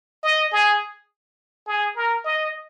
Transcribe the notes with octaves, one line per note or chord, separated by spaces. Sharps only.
D#5
G#4
G#4
A#4
D#5